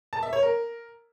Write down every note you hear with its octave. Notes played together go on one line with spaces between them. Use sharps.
A5
E5
C#5
A#4